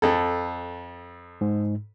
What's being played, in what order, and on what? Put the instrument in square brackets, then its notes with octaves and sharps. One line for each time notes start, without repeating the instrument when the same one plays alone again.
[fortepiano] F2 A4
[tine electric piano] G#2